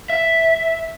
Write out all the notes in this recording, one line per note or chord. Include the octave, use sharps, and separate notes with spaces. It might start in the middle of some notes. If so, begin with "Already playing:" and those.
E5